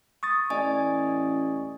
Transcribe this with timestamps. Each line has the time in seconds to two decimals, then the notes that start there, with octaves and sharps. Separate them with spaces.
0.23 C#6 D#6 A6
0.50 A1 D5 D#5 G#5